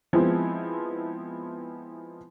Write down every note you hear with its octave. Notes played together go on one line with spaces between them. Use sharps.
F3 G#3 B3 C4 E4